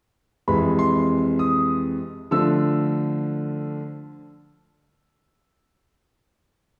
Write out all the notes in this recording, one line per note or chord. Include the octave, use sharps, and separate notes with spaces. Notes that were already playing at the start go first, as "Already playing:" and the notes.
F2 C3 E3 G#3 B5
C6
D#6
D3 F3 A3 E6